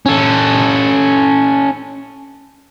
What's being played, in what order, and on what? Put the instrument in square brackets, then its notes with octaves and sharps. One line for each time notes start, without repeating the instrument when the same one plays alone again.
[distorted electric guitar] C#4 A4